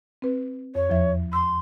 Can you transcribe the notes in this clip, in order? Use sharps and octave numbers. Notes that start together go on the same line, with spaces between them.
C4 B4
F2 C#5
E2 F3 E5
C6 E6